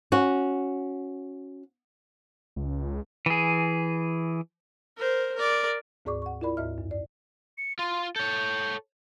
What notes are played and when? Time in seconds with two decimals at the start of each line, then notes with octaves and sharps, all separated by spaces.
0.12 C#4 F#4
2.56 C#2
3.26 E3 G#4
4.97 A#4 C5
5.36 A#4 D5
6.05 D2 G#2 G#4 D5 C#6 D6
6.22 F#5 C#6
6.41 E4 F4 A#4 D5 B5
6.57 D2 G#2 D#5 E5 F6
6.78 F#2
6.91 D5
7.58 C#7
7.79 F4 C6
8.16 A4 C#5 G6